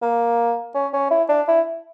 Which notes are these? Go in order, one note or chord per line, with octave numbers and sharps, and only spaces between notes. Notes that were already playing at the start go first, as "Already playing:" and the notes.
A#3
C#4
C#4
E4
D4
E4